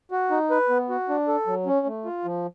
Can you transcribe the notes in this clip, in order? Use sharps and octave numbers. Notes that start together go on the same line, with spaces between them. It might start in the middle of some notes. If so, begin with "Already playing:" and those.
F#4
D#4
B4
B3
F#4
D4
A4
F#3
C#4
A3
F4
F3